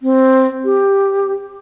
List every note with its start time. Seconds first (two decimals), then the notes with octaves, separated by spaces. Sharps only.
0.02 C4
0.65 G4